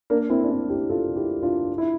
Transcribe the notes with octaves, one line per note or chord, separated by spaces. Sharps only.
A#3 D4
C4 E4
D4
C4 E4
E4 G4
F4 A4
E4 G4
D4 F4
E4